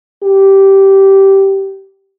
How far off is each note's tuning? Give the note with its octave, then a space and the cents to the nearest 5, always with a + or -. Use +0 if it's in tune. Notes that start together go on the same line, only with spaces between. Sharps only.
G4 -10